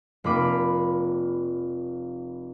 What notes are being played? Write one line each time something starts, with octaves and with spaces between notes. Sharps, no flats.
F1 A#3 F4 B5 D6 D#7